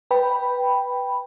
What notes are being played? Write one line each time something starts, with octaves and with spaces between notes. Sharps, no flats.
B4 G5 B5